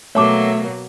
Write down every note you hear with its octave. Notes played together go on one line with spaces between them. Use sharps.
B2 F#3 A3 A#3 C#5 E5 A5 D6